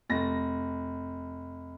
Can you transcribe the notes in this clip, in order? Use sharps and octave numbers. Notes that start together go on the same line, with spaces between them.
F1 A#6